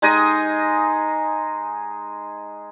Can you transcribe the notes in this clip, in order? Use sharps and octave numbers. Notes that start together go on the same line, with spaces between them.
G#3 D#4 G#4 D#5